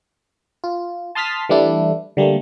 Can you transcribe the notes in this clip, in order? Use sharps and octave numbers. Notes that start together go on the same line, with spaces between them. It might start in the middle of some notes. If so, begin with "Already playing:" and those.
F4
A5 C6 D#6 F6 A6 B6
E3 G3 A3 D4 E4
D3 G3 A3 A#3